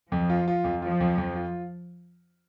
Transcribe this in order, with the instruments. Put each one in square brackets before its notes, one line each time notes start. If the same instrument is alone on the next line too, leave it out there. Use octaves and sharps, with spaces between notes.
[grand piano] F2 [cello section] F3
[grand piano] F4
F4
F2
[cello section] F3 [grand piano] F4
[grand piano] F2
F2
F4